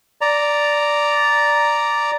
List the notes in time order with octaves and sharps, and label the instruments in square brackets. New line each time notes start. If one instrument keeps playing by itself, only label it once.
[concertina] D5 A#5